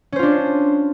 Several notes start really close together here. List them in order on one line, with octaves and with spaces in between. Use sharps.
C#4 C5 F4 D4